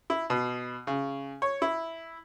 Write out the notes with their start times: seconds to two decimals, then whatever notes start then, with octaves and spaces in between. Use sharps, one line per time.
0.10 E4
0.30 B2
0.87 C#3
1.42 C#5
1.62 E4